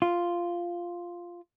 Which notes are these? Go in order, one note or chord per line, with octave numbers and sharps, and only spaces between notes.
F4